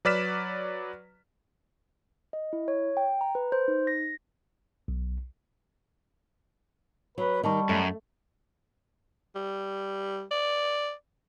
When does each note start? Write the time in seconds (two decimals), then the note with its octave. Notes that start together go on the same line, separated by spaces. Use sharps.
0.05 F#3 B4 D5 F6 B6 E7
2.33 D#5
2.53 E4
2.68 C#5
2.97 G5
3.21 A#5
3.35 B4
3.52 C5
3.68 D#4
3.87 A#6
4.88 B1
7.18 F#3 B4
7.43 D#3 G3 D#4 D#5 A5 C#6
7.69 F#2 A3
9.35 G3
10.31 D5